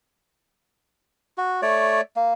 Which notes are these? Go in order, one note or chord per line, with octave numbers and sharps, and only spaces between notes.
F#4
A3 C#5 D5
A#3